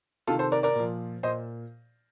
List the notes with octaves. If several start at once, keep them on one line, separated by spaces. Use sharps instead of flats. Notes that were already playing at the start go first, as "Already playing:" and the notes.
C3 D#3 F4 A4
A4 C5
A#4 D5
A#4 D5
A#2 F3
A#2 C5 D#5